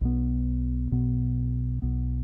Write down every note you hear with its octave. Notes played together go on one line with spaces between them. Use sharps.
B1 B2 B3
B1 B2 B3
B1 B2 B3